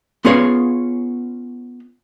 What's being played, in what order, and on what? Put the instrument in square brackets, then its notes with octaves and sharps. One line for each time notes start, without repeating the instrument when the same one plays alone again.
[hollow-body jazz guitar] B3 C#4 F4 G#4 C#5 F5